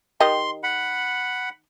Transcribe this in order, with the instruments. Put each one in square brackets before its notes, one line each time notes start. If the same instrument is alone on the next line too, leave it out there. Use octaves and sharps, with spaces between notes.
[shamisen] D#3 G4 D#5 [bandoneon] C6
[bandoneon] F#5 B5